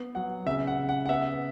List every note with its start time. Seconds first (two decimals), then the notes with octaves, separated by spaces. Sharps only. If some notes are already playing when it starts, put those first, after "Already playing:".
Already playing: B3
0.15 F#3 F#5
0.46 C#3 E5
0.67 F#5
0.78 C#3
0.89 F#5
1.06 F#5
1.09 B3 E5